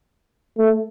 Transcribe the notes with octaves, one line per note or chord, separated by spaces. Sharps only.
A3